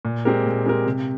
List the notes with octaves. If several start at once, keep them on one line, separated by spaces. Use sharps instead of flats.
A#2
G#3 C4 G4 A#4
A#2
G#3 C4 G4 A#4
C3